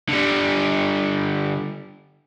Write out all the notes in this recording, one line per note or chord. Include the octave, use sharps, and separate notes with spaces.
D3 G3